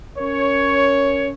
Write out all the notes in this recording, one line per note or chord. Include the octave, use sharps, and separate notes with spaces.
C#4 A#4 C#5